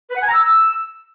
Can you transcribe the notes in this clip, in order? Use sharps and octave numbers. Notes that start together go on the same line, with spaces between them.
B4
F#5
G#5
A#5
E6